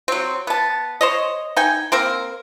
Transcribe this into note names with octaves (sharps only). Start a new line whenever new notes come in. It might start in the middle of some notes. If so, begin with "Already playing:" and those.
F#3 C4
B3 A5
C5 C#5 D#5
D#4 G5 G#5
A#3 C4 A#4